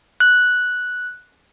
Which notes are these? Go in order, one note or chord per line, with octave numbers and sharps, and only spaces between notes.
F#6